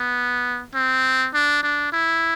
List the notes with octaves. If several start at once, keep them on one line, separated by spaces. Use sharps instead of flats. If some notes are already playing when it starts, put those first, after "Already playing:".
Already playing: B3
C4
D4
D4
E4